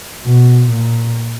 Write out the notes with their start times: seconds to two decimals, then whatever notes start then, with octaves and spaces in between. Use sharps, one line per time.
0.25 B2
0.70 A#2